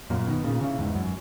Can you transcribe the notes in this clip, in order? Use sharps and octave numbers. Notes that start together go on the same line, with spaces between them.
F#2 A#2
B2 D#3
A#2 C#3
C#3 E3
E2 G#2
F#2